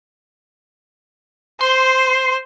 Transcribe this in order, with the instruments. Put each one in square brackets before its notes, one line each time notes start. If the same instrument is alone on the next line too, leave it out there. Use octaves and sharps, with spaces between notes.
[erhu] C5 [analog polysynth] C6